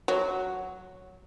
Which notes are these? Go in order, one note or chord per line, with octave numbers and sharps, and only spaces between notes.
F#3